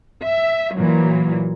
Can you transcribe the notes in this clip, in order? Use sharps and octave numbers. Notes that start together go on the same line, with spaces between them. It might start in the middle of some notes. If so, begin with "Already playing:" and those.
E5
A#2 E3 F#3